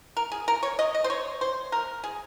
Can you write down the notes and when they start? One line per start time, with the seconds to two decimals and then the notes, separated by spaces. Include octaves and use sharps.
0.17 A#4
0.32 G#4
0.48 A#4
0.63 C#5
0.79 D#5
0.94 D#5
1.04 C5
1.10 C#5
1.41 C5
1.72 A#4
2.04 G#4